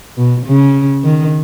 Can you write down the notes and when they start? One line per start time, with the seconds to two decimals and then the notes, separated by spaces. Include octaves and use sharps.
0.17 B2
0.46 C#3
1.04 D#3